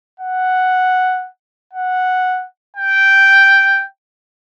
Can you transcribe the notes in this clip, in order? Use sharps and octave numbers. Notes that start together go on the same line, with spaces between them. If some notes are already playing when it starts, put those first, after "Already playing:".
F#5
F#5
G5